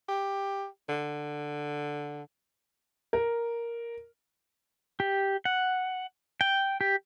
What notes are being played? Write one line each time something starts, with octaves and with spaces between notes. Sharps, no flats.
G4
D3
A#4
G4
F#5
G5
G4